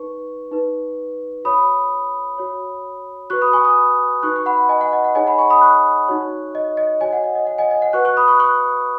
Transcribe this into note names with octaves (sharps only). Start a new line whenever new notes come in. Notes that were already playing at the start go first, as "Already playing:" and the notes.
Already playing: D#4 B4 C#6
D#4 B4
F#4 C#5 B5 D#6
F#4 C#5
F#4 B4 C#6 F#6
B5 D#6
G#5 C#6
B5 D#6
D#4 F#4 B4 C#6 F#6
C#6
F#5 B5
D#5 G#5
F#5
D#5
F#5
D#4 G#4 C#5 D#5 G#5
F#5 B5
G#5 C#6
B5 D#6
C#6 F#6
D#4 F#4 C#5
D#5
D#5
F#4 C#5 D#5 G#5
F#5
D#5
D#5
F#5
D#5 G#5
D#5
F#5
F#4 B4 C#6 F#6
C#6 F#6
B5 D#6
C#6 F#6
C#6 F#6